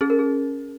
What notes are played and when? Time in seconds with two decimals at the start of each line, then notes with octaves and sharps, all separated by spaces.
0.01 C#4 G#4
0.10 A#4
0.19 G#4